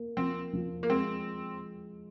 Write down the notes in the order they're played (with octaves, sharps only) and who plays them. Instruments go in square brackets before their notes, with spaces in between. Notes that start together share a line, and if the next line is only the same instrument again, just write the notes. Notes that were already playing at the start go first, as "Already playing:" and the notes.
Already playing: [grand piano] A#3
[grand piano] F3 [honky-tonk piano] C4
[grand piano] F3
[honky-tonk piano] A#3
[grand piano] G#3 [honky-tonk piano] C4